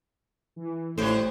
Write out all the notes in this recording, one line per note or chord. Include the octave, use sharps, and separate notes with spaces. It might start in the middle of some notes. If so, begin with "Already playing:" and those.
E3
A1 A2 F3 G3 C5 C#5 G5 F#6